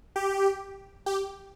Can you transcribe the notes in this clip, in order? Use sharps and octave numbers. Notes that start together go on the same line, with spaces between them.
G4
G4